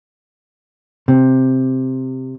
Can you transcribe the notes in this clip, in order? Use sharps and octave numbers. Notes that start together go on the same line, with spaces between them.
C3